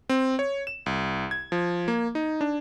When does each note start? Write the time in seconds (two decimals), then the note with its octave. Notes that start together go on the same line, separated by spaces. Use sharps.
0.09 C4
0.39 C#5
0.67 E7
0.86 C2
1.31 G#6
1.52 F3
1.88 A#3
2.15 D#4
2.41 D4